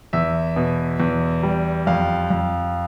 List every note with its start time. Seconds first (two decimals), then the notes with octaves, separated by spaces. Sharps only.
0.13 E2 E5
0.56 B2
1.00 E2
1.43 G3
1.87 F2 F5
2.30 F2